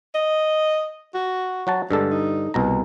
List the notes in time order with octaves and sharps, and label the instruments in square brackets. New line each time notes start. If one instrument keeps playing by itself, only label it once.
[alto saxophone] D#5
F#4
[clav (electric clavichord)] F#3 F#4 A5
[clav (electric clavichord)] G2 D3 A4 [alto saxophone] G#3
[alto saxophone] D#4
[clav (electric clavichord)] C2 B2 A#5 [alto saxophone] B3